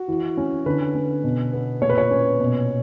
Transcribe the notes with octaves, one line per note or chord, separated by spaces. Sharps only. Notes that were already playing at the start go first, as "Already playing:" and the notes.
Already playing: F#4
E3
C#4
D3 B4
C#4
B2
B3
A#2 C#5
B4
C#5
C#4
B2